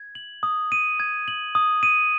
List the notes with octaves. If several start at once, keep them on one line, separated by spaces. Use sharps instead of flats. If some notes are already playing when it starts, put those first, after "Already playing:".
Already playing: G#6
F#7
D#6
D#7
G#6
F#7
D#6
D#7